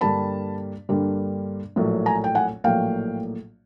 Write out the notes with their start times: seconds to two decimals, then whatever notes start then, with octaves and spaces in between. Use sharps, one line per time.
0.01 G2 D3 G3 A#3 A5 B5
0.89 G2 D3 G3 A#3
1.76 A#1 A2 F#3 A#3
2.06 G#5 A#5
2.24 G5
2.35 F#5 G#5
2.64 A#1 A2 F#3 A#3 F5 G5